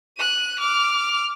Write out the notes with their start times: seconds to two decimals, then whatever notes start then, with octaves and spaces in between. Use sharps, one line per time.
0.17 F#6 D#7
0.59 D6 F6